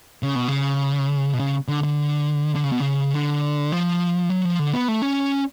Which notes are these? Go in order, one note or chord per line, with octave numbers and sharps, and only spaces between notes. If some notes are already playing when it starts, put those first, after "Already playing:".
C#3
B2
C#3
B2
C#3
D3
D3
D3
C#3
B2
C#3
D3
F3
F#3
F3
D3
B3
A3
C#4